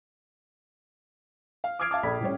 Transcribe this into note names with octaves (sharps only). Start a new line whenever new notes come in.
F5
D6 D#6 F6 G#6 C7 D7
E5 F5 A5 D6
A#1 A4 D5 B5 B6
A2 G3 C#4